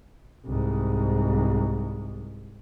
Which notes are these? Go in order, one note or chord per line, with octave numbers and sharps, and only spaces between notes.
C2 G#2